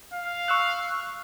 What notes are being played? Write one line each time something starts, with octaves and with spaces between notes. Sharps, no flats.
F5
C#6 E6 F#6